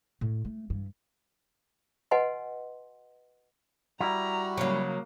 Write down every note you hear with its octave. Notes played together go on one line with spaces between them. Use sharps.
A2
A3
G2 E3
F#4 B4 D#5 F#5 G#5 C6
G3 E4 F#4 A#5
C#3 F#3 A#3